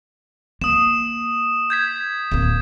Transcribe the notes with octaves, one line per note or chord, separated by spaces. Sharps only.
A#3 D#6 E7
G6 G#6 B6
D1 A#3